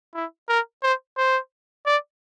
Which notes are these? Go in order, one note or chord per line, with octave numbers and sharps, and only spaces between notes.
E4
A#4
C5
C5
D5